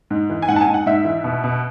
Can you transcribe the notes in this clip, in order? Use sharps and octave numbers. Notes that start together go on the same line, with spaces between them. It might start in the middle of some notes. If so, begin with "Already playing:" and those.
G#2
E3
G#5
G#2 F#5
A5
G#5
G#2
F#5
G#2 E5
E3
B2
B2